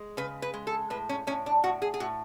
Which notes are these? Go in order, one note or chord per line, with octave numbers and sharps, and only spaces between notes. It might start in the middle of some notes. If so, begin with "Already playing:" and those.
Already playing: G#3
C#3 B4
B4
G#3
A4
A2 B4
C#4
A2 C#4
D4
A2 F#4
G#4
G#4
A2 F#4